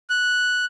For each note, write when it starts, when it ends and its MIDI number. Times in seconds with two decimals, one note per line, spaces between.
0.10 0.65 90